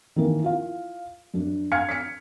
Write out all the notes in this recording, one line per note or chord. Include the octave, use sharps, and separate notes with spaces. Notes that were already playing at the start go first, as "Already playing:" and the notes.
D#3 E3 A#3 A#4
E4 F4 F5
F#2 D4
F5 F6 G#6 C#7
B6 C#7